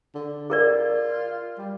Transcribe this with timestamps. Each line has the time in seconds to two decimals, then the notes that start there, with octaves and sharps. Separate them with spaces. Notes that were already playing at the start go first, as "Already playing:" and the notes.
0.15 D3
0.50 F4 G#4 A#4 D5
1.58 G3